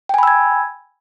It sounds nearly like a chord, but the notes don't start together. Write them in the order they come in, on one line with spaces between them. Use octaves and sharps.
G5 G#5 B5 E6 G#6